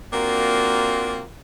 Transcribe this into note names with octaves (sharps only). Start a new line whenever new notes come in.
A#3 C4 D4 F4 F#4 A#4